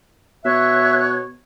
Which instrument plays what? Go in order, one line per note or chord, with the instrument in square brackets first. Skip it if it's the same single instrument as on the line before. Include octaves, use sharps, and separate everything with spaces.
[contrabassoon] B2 [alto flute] C#5 [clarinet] E5 [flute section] F#6